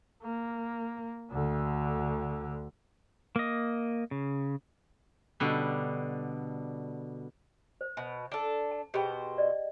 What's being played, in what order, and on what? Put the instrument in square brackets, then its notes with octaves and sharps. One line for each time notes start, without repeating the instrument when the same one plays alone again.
[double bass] A#3
D2 D3
[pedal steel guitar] A#3 D#5
C#3
[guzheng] B2 D3 G3
[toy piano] C5
[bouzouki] B2
D4 A4
[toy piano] A5
[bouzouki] B2 C5 [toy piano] G4 G#4 G5
[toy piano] D5 D#5